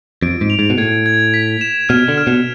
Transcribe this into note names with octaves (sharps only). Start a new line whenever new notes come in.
F2 D7
G#2
F7
G#2
B2
A2 G#6
G#6
B6
E7
B2 F6
D3
F6
B2